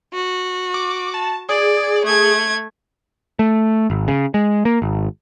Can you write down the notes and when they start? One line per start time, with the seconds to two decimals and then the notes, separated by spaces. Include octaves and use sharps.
0.14 F#4
0.74 D6
1.14 A5
1.49 G#4 D5
2.05 A3 G#6
3.39 A3
3.90 G#1
4.08 C#3
4.34 G#3
4.65 A#3
4.82 G#1